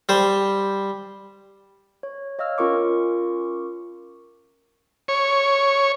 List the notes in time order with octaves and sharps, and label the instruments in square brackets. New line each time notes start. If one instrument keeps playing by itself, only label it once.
[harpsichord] G3 C5
[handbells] C#5
C#5 D#5 F5 E6 F6
C#4 F4 A#4 C#6 D6
[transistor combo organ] C#5